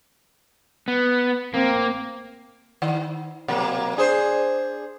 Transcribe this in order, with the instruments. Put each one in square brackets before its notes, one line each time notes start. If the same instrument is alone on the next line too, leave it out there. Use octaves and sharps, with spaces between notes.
[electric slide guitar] B3
[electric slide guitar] A#3 [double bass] C4
[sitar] D#3
B2 F#3 A#3
D4 G#4 C5